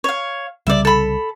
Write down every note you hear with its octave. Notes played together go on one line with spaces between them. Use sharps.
C#5 F5
C2 C#3 G3 D5 E5
A4 B5